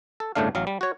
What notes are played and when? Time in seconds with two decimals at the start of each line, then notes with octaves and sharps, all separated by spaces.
0.20 A4
0.35 G1 A2 C#3 A3 D4 F5
0.55 A1 F#3 F5
0.67 G3
0.81 F#4 C#5